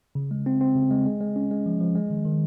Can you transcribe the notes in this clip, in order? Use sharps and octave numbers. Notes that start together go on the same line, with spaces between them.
C#3
G#3
C4
C4
C#3
G#3
G#3
G#3
C#4
G#3
F3
F3
G#3
D#3
D#3